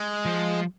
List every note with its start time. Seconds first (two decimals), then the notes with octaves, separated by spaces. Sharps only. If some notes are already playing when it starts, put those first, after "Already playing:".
Already playing: G#3
0.25 F3